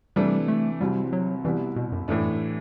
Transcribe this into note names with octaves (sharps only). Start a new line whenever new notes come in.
C3 E3 G3 A3 D4
A3
C2 C3 F#3 G3 C4 E4
F#3
C2 B2 E3 G3 B3 E4
B2
F#2
F#2 A2 E3 A3 D4